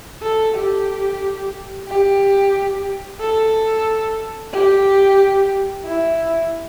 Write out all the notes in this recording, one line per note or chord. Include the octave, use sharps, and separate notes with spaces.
A4
G4
G4
A4
G4
E4